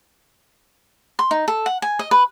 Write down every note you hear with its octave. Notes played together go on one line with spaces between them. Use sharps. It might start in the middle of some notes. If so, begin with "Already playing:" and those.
C6
D#4
A4
F#5
G#5
D#5
B4